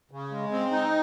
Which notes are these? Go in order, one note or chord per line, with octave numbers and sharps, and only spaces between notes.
C#3
G#3
C4
D#4